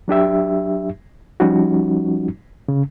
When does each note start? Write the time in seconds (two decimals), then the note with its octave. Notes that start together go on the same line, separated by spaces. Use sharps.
0.08 F#3 D4 G4 E5
1.40 F3 G3 C#4 D#4 F#4
2.68 C#3